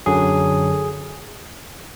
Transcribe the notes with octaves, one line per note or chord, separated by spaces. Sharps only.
F#2 D3 F#3 G#4